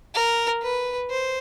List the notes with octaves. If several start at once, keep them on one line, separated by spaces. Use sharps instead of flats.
A#4
B4
C5